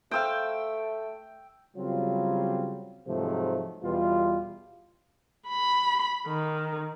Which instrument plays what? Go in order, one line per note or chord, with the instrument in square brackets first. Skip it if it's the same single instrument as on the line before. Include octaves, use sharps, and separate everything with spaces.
[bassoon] A3 [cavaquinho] C5 F5 [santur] G5 E6
[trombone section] C#3 F#3 G3 C4 F4
G#2 C3 F3 F#3 G#3 A3
E2 B2 G3 F4
[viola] B5
D#3